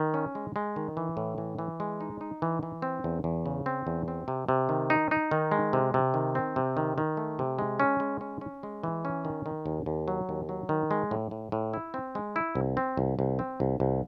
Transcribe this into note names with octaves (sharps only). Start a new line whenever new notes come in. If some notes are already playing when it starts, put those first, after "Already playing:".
Already playing: D#3
C#4
G#3
G#3
D#3
E3
A2
E3
E3
G#3
D#4
D#4
E3
E3
C4
E2
E2
C#3
C4
E2
C4
C3
C3
D#3
D#4
D#4
D#3
G#3
C3
C3
D#3
C4
C3
D#3
D#3
A3
C3
G#3
C#4
G#3
C#4
C#4
G#3
E3
C#4
D#3
D#3
D#2
D#2
F#3
D#2
F#3
D#3
G#3
A2
A2
A2
E4
C4
G#3
E4
C2
C4
C2
C2
C4
C2
C2